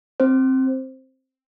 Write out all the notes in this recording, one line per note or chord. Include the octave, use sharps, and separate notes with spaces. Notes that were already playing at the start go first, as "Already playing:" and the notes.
C4 C5